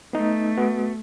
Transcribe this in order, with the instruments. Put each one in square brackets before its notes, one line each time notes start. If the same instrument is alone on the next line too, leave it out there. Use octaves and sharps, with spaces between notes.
[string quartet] A3 [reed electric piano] B3 D#4
[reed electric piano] B3 F#4